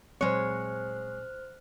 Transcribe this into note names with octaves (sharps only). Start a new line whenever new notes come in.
A#2 F#3 G#3 C4 C5 C#5 F6 F#6